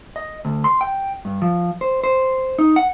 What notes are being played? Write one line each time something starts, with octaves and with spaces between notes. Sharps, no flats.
D#5
D2
C6
G5
G2
F3
C5
C5
D#4
F#5